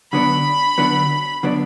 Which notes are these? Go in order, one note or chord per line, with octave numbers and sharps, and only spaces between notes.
D3 F#3 B3 D4 B5
D3 F#3 B3 D4
D3 F#3 B3 D4